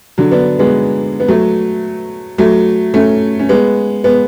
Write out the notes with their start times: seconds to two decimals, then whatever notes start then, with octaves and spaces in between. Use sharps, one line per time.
0.18 D3 F#3
0.31 B3 D4
0.59 G#3 B3
1.20 B3
1.28 F#3 A3
2.38 F#3 A3
2.94 A3 C#4
3.39 C#4
3.49 G#3 B3
4.04 G#3 B3